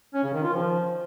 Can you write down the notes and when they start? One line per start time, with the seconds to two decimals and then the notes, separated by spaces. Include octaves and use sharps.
0.14 C#4
0.24 C#3
0.34 D#3
0.44 F4
0.53 F3